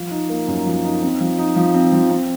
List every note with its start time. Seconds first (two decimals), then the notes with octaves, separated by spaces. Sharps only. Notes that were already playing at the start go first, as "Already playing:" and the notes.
Already playing: F3
0.11 D#4
0.30 A#3
0.48 F#2
0.66 F3
0.84 D#4
1.02 C4
1.20 F3
1.38 D#4
1.56 F3
1.74 C4
1.92 F3
2.10 C4